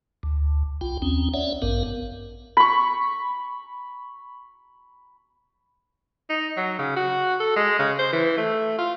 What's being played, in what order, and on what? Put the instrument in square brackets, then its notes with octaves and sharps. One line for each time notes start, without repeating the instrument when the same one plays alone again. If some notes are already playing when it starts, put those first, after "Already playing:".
[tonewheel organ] D2
B1 F4 G5
D#2 C4 C#4
C#4 C#5 D5 E5 F#5
A1 G2 B3 A#4 F5
[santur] B5 C#6
[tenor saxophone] D#4
F#3
C#3
F#4
A4
G#3
C#3
C5
E3
A3
F4